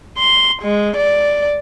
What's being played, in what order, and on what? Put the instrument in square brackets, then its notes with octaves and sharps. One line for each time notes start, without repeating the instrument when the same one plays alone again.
[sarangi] C6
G#3
D5